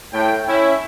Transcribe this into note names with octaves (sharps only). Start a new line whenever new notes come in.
A2 G5
C#4 E4